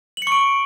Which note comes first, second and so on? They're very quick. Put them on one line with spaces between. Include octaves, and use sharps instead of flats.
F#7 C#7 C#6 D7